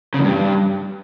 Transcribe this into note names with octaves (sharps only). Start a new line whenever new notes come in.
C#3
E2
G2